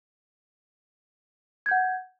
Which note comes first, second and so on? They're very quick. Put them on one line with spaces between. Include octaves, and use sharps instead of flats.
G#6 G6 F#5